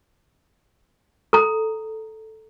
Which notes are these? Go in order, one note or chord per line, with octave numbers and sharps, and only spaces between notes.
A4 A#5